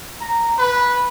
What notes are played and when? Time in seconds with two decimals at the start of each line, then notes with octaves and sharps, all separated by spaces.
0.21 A#5
0.59 B4